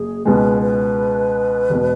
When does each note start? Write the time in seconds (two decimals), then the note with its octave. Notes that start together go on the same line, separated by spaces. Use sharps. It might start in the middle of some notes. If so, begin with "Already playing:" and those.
Already playing: F#1 G#4
0.25 C#2 B2 G#3 B4
0.62 B4
1.70 E1 B2